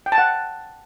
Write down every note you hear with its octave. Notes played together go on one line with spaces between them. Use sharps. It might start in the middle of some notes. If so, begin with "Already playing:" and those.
G5
A5
F#5